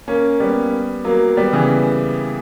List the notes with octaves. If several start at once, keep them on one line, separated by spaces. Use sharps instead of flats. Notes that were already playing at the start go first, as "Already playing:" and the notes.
A#3 C#4
G3 B3
F#3 A#3
G3 B3
C#3 E3